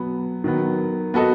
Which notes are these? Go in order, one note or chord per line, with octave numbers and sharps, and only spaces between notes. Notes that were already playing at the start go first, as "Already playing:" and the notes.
Already playing: B2 F#3 B3
D#3 F#3 B3
B3 F#4 A4 D#5